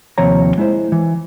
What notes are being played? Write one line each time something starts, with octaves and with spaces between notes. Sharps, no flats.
D#2 C3 F3 C#5 A#5
G#3 E4 C5
E3